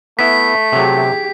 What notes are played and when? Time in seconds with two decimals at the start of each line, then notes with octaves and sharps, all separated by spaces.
0.19 A3 B3 E4 B6
0.72 C3 F#3 G4 G#4